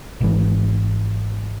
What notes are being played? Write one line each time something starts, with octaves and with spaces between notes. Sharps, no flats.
G#1 G#2 E3